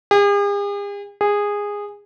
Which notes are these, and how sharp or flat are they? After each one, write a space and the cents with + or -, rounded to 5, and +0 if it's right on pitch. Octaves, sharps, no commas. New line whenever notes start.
G#4 -45
G#4 -15